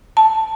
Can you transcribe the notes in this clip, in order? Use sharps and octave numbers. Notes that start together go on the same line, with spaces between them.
A5